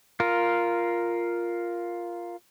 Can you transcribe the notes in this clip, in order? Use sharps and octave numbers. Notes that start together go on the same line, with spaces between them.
F4 A#4